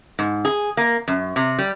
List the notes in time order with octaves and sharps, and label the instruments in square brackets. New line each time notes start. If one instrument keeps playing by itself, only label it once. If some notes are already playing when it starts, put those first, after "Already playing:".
[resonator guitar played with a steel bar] G#2
G#4
A#3
F#2
C3
G3